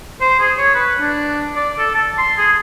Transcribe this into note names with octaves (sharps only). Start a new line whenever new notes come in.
C5
G#4
C#5
B4
D4
D5
A4
A5
C6
G#4